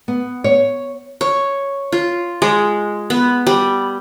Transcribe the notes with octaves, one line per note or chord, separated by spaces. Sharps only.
B3
C#5
C#5
F4
G#3
B3
G3